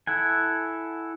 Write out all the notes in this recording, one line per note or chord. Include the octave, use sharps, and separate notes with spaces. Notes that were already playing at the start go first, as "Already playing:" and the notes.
E4 A4 F#5 G#5